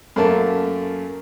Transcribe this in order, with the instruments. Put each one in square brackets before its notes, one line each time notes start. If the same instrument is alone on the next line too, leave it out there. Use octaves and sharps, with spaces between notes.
[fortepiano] F#2 A3 A#3 A5